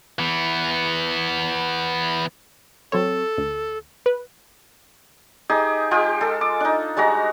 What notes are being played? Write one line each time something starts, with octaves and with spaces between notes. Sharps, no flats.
E3 B3
F#3 C4 A4 C#5
D2
B4
D#4 G4 G#4
G#3 F4 G4 G5
G#3 A4
D6
D4 D#4
G3 G#3 F#4 A#5